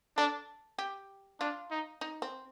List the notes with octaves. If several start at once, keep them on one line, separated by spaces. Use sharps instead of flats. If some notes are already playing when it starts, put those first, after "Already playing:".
D4 A4
G4
D4 F4
D#4
D#4
C4